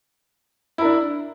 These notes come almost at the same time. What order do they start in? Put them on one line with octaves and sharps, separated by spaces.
E4 A#4 D4